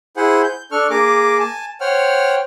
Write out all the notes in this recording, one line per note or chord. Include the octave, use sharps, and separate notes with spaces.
E4 G#4 C5 F#5
G6
D4 A4 C#6 F6
A#3 G#4 A#4 D6
G#5 A5
C5 C#5 F#5 G5 F6